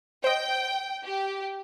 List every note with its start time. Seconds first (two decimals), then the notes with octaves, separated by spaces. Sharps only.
0.24 C5 D#5 G5
1.05 G4